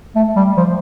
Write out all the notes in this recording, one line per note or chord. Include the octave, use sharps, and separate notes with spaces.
A3
G3
F3